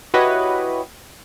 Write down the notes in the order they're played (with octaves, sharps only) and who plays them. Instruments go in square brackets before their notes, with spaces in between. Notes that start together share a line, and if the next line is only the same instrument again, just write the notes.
[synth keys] E4 F#4 G4 B4 C#5 D#5